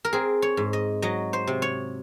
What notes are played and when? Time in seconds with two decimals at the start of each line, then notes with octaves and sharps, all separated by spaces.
0.05 A#4
0.13 C4 G#4
0.42 C#5
0.57 G#2
0.73 D#5
1.02 F#3 D#5
1.33 C5
1.47 C3
1.62 C#5